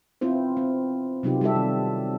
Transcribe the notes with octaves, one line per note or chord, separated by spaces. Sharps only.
B3 C4 E4 F4 C5
C4
C3 F#3 B3 D#4 F4 G4
G3 G4 A4 E5
D#3 C4